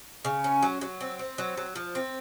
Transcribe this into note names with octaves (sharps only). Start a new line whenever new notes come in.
C#3
C#4
F#3
F#3
C4
C4
F#3
F#3
F3
C4